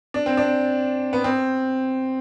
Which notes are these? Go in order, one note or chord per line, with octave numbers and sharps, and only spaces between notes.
D4
C4
D4
B3
C4